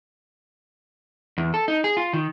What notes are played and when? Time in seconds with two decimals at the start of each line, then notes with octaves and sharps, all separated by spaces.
1.38 E2
1.54 A4
1.68 D#4
1.84 G#4
1.97 F4
2.13 D#3